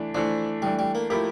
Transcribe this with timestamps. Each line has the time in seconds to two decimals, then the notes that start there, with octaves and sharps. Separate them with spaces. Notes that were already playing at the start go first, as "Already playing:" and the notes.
Already playing: E3 A3 D4
0.15 E3 F3 A3 D4
0.62 E3 G3 A3 D4
0.79 G3
0.95 A#3
1.10 F3 A3 A#3 E4 G4